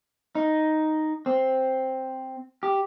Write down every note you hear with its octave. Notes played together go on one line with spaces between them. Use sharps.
D#4
C4
G4